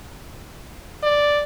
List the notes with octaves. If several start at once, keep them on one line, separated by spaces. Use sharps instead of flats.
D5